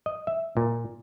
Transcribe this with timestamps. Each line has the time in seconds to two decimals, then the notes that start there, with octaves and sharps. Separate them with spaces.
0.06 D#5
0.27 E5
0.57 A#2